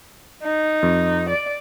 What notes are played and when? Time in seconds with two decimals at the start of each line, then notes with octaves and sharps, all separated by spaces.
0.44 D#4
0.83 F2
1.29 D5